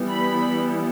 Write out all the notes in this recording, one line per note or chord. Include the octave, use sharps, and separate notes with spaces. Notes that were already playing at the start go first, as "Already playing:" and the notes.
Already playing: E3 G3 B3
B5